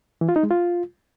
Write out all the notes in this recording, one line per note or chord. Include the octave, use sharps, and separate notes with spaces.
E3
F4
D#4
G#3
F4